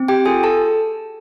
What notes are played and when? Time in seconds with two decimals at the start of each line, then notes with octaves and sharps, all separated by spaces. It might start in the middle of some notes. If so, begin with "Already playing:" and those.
Already playing: C4
0.08 G4 G5
0.26 F4 G#4 A4 G#5
0.43 A4 A5